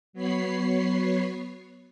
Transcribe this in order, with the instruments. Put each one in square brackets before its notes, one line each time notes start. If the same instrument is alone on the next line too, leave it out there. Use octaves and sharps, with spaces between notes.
[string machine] F#3 B3 C#5 B5 C7